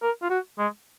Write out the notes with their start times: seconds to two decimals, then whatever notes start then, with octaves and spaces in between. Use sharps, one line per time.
0.02 A#4
0.22 F4
0.30 F#4
0.59 G#3